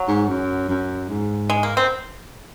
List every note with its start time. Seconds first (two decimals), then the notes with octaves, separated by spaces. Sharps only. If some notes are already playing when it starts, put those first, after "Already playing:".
Already playing: F#3
0.08 G#2
0.28 F#2
0.70 F#2
1.10 G#2
1.50 G#3
1.63 A#3
1.77 C4